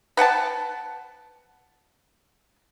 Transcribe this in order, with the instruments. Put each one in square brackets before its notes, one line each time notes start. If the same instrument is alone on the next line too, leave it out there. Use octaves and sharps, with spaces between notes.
[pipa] B4 F#5 G5 A5